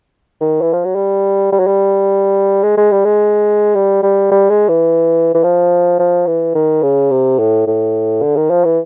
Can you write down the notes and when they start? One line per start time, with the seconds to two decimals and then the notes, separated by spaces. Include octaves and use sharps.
0.40 D#3
0.61 E3
0.73 F3
0.85 F#3
0.95 G3
1.52 G3
1.59 F#3
1.67 G3
2.63 G#3
2.77 G#3
2.92 G3
3.05 G#3
3.75 G3
4.03 G3
4.31 G3
4.50 G#3
4.68 E3
5.34 E3
5.44 F3
5.99 F3
6.27 E3
6.55 D#3
6.83 C#3
7.11 C3
7.39 A2
7.67 A2
8.22 D3
8.36 D#3
8.50 F3
8.64 E3